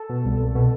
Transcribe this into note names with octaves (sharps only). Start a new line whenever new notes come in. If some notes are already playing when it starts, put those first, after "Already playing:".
Already playing: A4
B2
C2
C2
B2